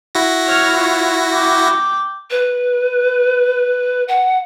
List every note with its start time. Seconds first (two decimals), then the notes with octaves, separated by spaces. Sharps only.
0.15 E4 F#4 A#6
0.47 C#5 F6
0.77 F4 C#5
1.30 G5 D6
2.31 B4
4.08 F#5